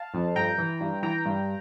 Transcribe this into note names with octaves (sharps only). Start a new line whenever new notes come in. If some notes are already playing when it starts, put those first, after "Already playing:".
Already playing: F5 A5
F2
G2 G5 A#5
E3
G2
E3 G5 A#5
G2